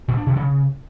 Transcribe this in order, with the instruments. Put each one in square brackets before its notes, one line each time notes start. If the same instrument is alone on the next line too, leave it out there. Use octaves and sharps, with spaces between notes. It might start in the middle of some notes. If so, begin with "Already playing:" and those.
[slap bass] A#2
D4
B2
C#3